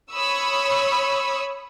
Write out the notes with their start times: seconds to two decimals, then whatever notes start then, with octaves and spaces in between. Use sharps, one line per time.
0.12 C#5 B5 C#6 D#6 E6